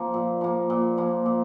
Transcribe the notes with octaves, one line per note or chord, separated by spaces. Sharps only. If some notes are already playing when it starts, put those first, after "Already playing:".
Already playing: F3 A#3
A#2
F3 A#3
A#2
F3 A#3
A#2